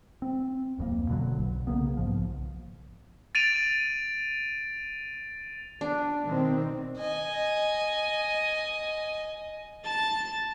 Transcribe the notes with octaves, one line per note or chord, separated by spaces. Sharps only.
C4
D1 F2 E3 A#3
B2 D3 E3 F#3
B1
C#3 A#3 B3
B1 G#2 F3
A6 D7 D#7 F7
D4
B2 D#3 C4
D#5 G#5
A5 A6